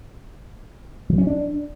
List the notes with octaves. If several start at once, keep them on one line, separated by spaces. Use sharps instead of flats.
F#3
C#4
D4